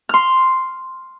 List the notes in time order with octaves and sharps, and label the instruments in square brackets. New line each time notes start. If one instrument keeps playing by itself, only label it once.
[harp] C6 F6